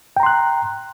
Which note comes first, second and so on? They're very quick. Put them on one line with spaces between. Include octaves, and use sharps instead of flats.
G5 A#5 C6 F#6